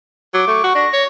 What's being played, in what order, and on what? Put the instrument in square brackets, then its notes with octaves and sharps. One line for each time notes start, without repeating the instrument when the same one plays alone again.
[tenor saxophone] F#3 [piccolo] D6
[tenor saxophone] A3 [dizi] C#6
[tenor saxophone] F#4
[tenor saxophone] D4 [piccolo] A#6
[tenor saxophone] C#5